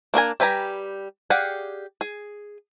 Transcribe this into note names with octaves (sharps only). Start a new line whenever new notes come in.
A#3 D4 A#4 G#5
G3 G4 B4 G#5 A#5
G4 G#4 D5 F5 F#5
G#4